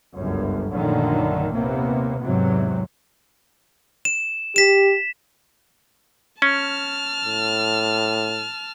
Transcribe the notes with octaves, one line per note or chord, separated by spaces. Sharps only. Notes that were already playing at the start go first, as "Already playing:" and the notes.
G1 C#2 F#2
A#1 F#2 D3 D#3 A3
D#2 C3 A#3 B3
E2 G#2 C3 F#3
E7
G4 B6 E7
C#4 A5 F6
A2